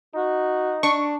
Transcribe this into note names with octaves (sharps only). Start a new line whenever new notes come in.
D#4 F#4
D4 C#6